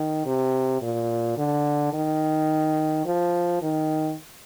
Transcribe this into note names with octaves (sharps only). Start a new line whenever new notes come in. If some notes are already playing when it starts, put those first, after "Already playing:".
Already playing: D#3
C3
A#2
D3
D#3
F3
D#3